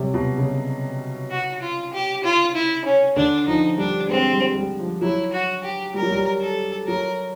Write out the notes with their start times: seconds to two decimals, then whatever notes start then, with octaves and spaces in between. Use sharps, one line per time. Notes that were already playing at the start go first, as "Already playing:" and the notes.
Already playing: C3 F#3 G3
0.14 B2
0.38 C#3
1.31 F#4
1.61 F4
1.93 G4
2.23 F4
2.55 E4
2.85 C#4
3.16 D3 D4
3.47 F3 D#4
3.78 G3 D4
4.09 G#3 C4
4.33 G3
4.55 G3
4.79 F3
5.01 F#3 E4
5.33 F#4
5.64 G4
5.94 G3 A#4
6.03 F#3
6.11 G3
6.41 A4
6.87 F#3 A#4